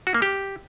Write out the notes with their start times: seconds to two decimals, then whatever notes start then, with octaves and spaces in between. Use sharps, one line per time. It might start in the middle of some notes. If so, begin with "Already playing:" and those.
0.07 F#4
0.14 A#3
0.22 G4